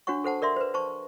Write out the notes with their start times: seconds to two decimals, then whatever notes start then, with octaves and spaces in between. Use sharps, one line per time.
0.07 D4 F#4 C#5 F#5 C#6
0.24 A4 C5 F#5 A5
0.42 A#4 D5 E5 C6
0.56 B4 C5
0.74 C5 A5 C#6